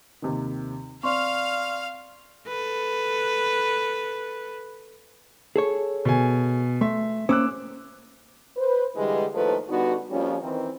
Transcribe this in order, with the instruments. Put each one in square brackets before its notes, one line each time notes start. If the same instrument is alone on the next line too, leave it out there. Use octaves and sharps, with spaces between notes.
[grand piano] D#2 C3 D#3
[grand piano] C4 [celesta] D5 C6 C#6 [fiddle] F5 F6
[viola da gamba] A4 B4
[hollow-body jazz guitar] G#4 A4 C#5
[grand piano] B2 G#5
[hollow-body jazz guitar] A3 [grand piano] E5 C6
[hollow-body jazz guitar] A#3 C#4 C5 [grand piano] D6 E6 F#6
[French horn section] B4 C5
G2 D3 E3 G3 G#3
D#2 A2 F3 A3 A4 B4
D3 G3 B3 D#4 F#4
F2 F3 G3 A#3 C#4
D#3 E3 C4